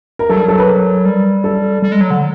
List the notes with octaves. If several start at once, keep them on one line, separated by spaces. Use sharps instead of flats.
A#4
F#3 A4
G3
F#3 A4
B4
A#4
G3
A4
G3
G#3
F#3
D3